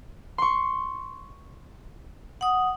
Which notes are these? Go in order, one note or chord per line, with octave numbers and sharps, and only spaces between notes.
C6 C#6
F#5 D#6